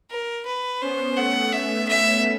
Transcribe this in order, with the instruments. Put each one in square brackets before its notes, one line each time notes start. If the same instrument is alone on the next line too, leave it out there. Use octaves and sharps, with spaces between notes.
[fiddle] A#4
B4
[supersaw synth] B3 C#4 [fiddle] C5
[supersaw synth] A3 B3 [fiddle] F#5
[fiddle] E5
E5